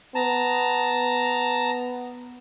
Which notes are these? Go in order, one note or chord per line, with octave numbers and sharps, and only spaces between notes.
B3 A5 A#5